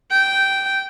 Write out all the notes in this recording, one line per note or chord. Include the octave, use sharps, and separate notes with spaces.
G5